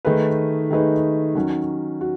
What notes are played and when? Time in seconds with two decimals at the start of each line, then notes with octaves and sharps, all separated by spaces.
0.05 D#3 A3 D#4 G#4 B4
0.70 D#3 A3 D#4 G#4 B4
1.35 D#3 F#3 C#4 F#4
2.01 F#4